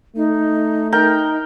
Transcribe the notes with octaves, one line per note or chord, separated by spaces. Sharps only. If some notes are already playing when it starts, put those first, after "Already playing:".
A3 D#4
D#4 A#4 G5